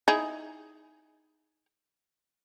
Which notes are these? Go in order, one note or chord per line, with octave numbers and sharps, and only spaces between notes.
D#4 E4 G#4